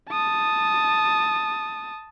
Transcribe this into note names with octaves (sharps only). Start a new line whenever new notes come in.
A5 D#6